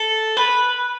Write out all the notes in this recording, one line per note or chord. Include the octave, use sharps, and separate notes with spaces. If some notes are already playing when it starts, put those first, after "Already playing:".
Already playing: A4
B4